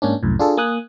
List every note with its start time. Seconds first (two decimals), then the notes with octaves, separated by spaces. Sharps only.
0.02 G#2 A#3 C#4 D4
0.23 C2 F#2 A2
0.39 D4 F4 G#4 A4
0.57 A#3 G#5 D#6 F#6